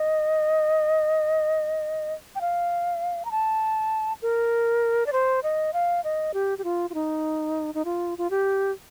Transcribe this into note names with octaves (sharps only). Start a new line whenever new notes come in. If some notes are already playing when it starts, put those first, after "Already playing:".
Already playing: D#5
G5
F5
A#5
A5
A#4
D5
C5
D#5
F5
D#5
G4
G4
F4
F4
D#4
D#4
F4
F4
G4